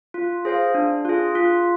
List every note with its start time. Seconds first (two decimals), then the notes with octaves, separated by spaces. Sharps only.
0.14 F4
0.45 G#4 C5 F5
0.74 D4
1.05 F4 G#4
1.35 F4